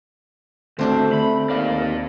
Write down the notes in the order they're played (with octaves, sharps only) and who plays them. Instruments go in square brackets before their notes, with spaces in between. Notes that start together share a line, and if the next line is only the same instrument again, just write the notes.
[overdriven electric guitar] D2 [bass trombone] A3 [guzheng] C4 D4 G4
[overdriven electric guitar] B5
[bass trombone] D#2 [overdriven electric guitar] D5 F5